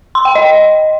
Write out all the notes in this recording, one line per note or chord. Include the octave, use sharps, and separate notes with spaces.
C6
G5
D#5